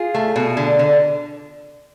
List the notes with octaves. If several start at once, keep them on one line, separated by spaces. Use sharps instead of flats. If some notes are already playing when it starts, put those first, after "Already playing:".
Already playing: F4 G#4
A3
B2
D3
D3